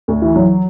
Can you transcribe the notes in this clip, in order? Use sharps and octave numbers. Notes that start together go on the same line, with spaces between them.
D2
E3
F#3